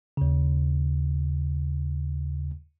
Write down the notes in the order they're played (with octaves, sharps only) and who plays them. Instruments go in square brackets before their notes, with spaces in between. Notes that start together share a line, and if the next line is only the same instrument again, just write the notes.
[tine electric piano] D#2 C#3